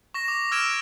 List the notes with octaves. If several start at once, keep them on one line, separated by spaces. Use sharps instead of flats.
C#6 A#6 E7
D6
E6 F6 G#6 D7 E7